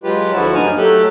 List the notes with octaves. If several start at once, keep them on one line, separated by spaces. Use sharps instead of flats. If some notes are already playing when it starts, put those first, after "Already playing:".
F#3 G#3 F4 G4 B4
D2 D3 F3 E4 F#4 A5
G2 F#3 A#3 D#4 G#5 F6
F#3 A3 G4 A4 F#6